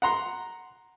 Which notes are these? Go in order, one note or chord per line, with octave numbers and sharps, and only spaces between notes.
F#5 A#5 C6